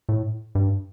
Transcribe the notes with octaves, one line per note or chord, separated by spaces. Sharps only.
A2
G2